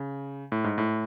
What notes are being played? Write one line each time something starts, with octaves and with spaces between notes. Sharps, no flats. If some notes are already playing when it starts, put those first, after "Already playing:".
Already playing: C#3
A2
G#2
A2